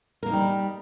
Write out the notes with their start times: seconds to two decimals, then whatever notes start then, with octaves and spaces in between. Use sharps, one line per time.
0.23 A#4
0.26 A#3
0.30 D#4
0.33 G3